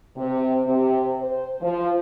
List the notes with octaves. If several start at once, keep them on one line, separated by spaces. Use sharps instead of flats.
C3
C3
C5
F3